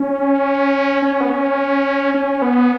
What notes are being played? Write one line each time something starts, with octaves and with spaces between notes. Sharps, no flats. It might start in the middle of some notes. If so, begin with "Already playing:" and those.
Already playing: C#4
C#4
B3
C#4
C#4
B3